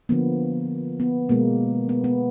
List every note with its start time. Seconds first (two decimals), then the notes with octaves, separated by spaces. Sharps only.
0.09 D3 F3 A#3 B3
1.00 B3
1.29 B2 G#3 A#3
1.89 B3
2.04 B3